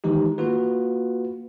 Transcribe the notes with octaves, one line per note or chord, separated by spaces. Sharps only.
D#3 E3 G#3 D#4 G4
A#3 F4 F#4 B4